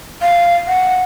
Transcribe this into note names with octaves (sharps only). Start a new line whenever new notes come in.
F5
F#5